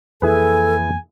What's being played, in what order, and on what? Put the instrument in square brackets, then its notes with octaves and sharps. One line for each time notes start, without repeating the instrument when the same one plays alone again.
[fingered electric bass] F2 E3 A#3 [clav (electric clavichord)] E4 G#4 B4 [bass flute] A4 [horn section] G#5